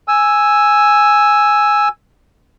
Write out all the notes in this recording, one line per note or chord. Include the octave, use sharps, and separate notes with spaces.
G#5 E6